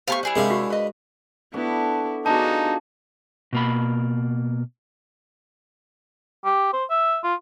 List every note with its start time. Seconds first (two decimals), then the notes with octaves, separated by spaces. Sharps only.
0.08 A3 B3 G4 C5 F5 A5 C#6
0.23 G3 E4 G#4 F#5
0.36 C3 G3 G#3 D4 A#4 E5 F5
0.50 F#4 G4
0.70 B4 D#5
1.54 B3 D4 E4 F#4 A4
2.26 B3 D4 D#4 F4 F#4 G#4 A5
3.53 B2 A#3 B5
6.45 G4
6.73 C5
6.90 E5
7.24 F4